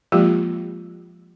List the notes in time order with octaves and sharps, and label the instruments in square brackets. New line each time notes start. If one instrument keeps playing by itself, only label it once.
[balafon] F3 G#3 A#3 F4 G4